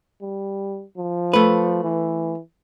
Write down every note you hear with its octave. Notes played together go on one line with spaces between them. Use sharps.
G3
F3
A3 B4
E3